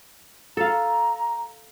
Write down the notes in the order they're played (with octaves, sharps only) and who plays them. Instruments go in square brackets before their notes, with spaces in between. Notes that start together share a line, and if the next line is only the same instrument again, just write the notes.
[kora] A4 F5 [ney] A#5